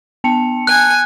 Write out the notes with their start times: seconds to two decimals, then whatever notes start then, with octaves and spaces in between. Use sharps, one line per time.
0.24 B3 A5 C#7
0.67 G#5 F#6